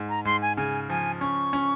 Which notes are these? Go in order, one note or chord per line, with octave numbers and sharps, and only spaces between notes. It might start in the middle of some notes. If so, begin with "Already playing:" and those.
Already playing: G#2
A#5
G#2 C6
G#5
C#3 G#5
F3 G#5
C#4 C#6
C#4